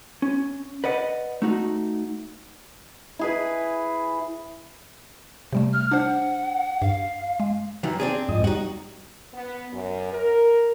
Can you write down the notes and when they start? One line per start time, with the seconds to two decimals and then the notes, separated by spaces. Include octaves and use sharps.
0.22 C#4
0.84 B4 D5 D#5 F#5
1.42 A3 D#4 F#4
3.19 E4 G#4 B4
5.53 C3 G3 A3
5.73 F6
5.91 D4 C5 F#5
6.82 G2 F5
7.40 G#3
7.83 F#2 D#3 E3
8.00 C4 D4 G#4
8.29 F2 G#2 D#5
8.44 G3 D#4 F#4
9.33 B3
9.73 F#2
10.12 A#4